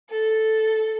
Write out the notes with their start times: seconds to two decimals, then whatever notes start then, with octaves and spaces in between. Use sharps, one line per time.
0.10 A4